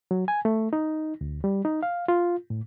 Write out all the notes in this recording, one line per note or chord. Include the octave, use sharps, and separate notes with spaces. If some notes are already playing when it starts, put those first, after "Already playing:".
F#3
G#5
A3
D#4
D2
G3
D#4
F5
F4
A2